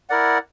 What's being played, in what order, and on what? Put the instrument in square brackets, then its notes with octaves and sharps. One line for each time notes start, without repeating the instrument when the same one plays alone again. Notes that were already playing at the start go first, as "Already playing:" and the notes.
[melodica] E4 A#4 D5 F#5